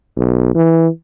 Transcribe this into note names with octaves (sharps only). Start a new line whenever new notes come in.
B1
E3